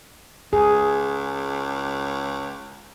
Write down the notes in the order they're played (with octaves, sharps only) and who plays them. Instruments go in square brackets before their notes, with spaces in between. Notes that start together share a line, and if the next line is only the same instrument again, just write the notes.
[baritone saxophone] C#2 [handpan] G#4